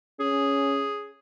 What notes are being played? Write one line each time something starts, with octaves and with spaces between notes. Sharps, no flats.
C#4 G#4